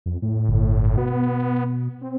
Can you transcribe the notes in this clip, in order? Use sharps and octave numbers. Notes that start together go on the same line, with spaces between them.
F2
A2
G1
B2 B3
C4